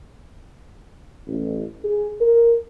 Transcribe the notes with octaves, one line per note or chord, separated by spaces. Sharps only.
A1
G#4
A#4